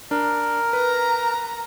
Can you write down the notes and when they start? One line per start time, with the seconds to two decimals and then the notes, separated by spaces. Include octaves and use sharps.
0.11 D4 A#4
0.73 B4 A#5